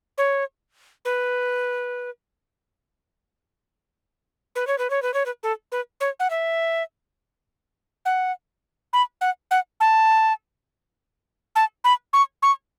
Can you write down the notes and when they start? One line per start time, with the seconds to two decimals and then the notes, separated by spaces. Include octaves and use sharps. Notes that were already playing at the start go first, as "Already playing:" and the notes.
0.18 C#5
1.05 B4
4.55 B4
4.67 C#5
4.78 B4
4.90 C#5
5.02 B4
5.14 C#5
5.25 B4
5.43 A4
5.72 B4
6.00 C#5
6.19 F#5
6.30 E5
8.05 F#5
8.93 B5
9.21 F#5
9.51 F#5
9.80 A5
11.55 A5
11.84 B5
12.13 C#6
12.42 C#6